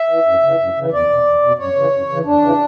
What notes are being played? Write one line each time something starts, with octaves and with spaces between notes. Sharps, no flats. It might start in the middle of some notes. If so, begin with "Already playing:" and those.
Already playing: E5
E3
F#2
C#3 E3
F#2
C#3 E3
E2 D5
B2
E2
B2
F#2 C#5
C#3 E3
F#2
C#3 E3
E2 D4
C#3 E3